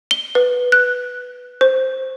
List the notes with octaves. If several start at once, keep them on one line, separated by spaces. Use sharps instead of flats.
G7
B4
F#6
C5